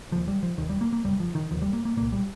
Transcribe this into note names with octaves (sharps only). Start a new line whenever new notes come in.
F1 D#2 F3
G3
F3
F1 D#2 D#3
G3
A#3
A#3
F1 D#2 G3
F3
D#3
F1 D#2 F3
G3
A#3
A#3
C2 A#2 A#3
G3